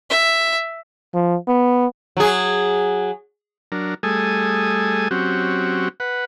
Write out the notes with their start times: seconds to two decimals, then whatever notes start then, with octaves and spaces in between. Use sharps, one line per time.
0.10 E5
1.14 F3
1.48 B3
2.17 F#3 G#4
3.72 F#3 D4 A#4
4.03 G3 A3 G#4 A4 G#5 D#6
5.11 F#3 C4 C#4 F#4 G4
6.00 B4 F#5